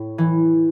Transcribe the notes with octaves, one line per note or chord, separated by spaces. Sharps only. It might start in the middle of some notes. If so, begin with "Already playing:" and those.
Already playing: A2
E3